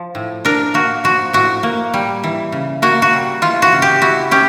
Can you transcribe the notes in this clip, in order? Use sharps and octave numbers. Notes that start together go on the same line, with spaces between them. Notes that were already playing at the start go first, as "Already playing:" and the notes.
Already playing: F3
A2
D4 A#4
A#3 F#4
F3 F#4
A2 F#4
A#3
G3
E3
C#3
A#3 F#4
F#4
G3
E3 F4
F#4
C#3
G4
E4 F#4
C#4 G4